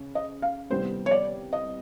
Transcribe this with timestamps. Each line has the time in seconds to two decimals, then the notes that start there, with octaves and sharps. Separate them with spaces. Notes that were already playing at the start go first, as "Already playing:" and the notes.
Already playing: C#3
0.15 D#5
0.42 F5
0.69 C2 C3 D#3 G3 B3 C5
1.06 C#5
1.11 D5
1.53 D#5